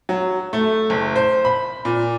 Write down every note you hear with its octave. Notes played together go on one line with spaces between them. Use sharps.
F#3
A3
F#1
C5
B5
A#2